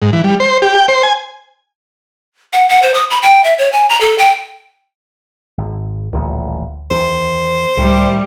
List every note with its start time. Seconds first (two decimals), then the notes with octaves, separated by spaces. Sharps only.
0.02 G#2
0.13 E3
0.24 G3
0.40 C5
0.62 G4
0.75 G5
0.88 C5
1.03 G#5
2.53 F#5
2.69 F#5
2.82 C5
2.94 D#6
3.10 B5
3.23 G5
3.44 E5
3.58 C#5
3.72 G#5
3.90 A#5
4.01 A4
4.18 G5
5.58 G#1
6.13 D#1 A1 D2
6.91 E2 D#3 C5
7.77 C#2 A2 D#3 G3